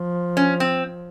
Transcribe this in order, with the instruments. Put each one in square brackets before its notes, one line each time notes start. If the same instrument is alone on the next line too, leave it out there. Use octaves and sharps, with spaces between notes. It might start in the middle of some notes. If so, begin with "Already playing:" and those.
Already playing: [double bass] F3
[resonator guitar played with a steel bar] C#4
C4